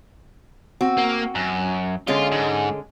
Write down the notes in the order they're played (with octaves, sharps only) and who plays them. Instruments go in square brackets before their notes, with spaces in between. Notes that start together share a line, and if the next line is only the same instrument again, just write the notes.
[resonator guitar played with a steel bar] C4 F#4
[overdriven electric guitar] A#3
F#2
[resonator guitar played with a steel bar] D3 G#3 C#4 [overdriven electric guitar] F4
[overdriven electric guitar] G#2